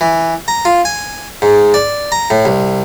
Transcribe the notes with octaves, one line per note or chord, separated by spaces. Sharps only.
E3
A#5
F4
G#5
G#2
D5
A#5
A2
C2